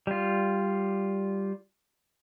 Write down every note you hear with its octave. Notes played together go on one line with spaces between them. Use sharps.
G3 F4